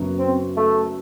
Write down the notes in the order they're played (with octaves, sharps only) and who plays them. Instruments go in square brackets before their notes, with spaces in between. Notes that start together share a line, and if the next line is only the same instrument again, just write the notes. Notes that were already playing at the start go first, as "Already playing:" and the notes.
Already playing: [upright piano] F#1 F#2 F#3 B3 F#4
[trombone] C4
A3